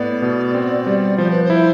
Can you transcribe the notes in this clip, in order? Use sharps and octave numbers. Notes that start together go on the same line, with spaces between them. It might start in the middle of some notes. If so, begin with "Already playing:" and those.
Already playing: A2 B3 D5
B2
C4
G3
F3 C5
B4
C5
E4